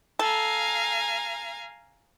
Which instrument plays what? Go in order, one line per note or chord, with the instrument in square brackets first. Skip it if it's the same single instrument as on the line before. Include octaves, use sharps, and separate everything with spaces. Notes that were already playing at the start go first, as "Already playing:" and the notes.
[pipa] A4 [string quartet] F5 G#5 A#5